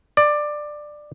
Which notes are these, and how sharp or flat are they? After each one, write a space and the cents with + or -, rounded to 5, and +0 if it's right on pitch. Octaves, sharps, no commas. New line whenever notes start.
D5 +15